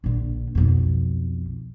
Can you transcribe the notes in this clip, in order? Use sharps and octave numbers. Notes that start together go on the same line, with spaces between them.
A#1 D3
B1 F2